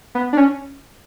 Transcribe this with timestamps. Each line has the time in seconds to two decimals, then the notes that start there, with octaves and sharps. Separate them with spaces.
0.15 B3
0.33 D4
0.37 C#4